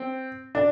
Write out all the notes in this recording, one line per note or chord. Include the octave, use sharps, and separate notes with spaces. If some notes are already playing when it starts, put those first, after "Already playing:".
Already playing: C4
D4